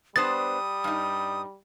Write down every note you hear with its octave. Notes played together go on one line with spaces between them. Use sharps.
G3 B3 D4 C5 D#6 A6
G2 D#4